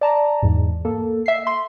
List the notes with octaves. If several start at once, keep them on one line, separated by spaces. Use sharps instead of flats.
D5 A5 A#5
E2 G#2
A#3 A4
E5 C7
C6